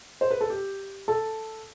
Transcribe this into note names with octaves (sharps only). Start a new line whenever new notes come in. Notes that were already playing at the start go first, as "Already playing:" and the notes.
C5
B4
A4
G4
A4